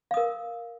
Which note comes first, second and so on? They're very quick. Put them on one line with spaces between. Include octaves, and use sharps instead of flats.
F5 D#6 A#4